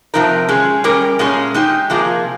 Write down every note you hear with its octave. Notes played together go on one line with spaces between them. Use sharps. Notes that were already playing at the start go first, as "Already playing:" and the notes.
C3 F3 C4 D#4 A#4
G#3 C#4 G#4
G3 C#4 G4 A#4
A#2 G#3 C#4 G#4
G#3 D#4 G4
C3 F3 A#3 F4 G#4